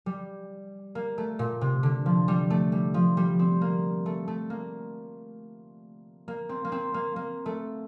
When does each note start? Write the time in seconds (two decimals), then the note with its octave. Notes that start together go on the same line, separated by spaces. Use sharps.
0.06 G3
0.95 A#3
1.18 A3
1.39 A#2
1.61 C3
1.83 D3
2.06 F3
2.28 G3
2.50 A3
2.72 G3
2.94 F3
3.17 G3
3.39 C4
3.61 A#3
4.06 A3
4.28 A3
4.50 A#3
6.28 A#3
6.49 C4
6.65 A#3
6.72 C4
6.94 A#3
7.16 A#3
7.46 A3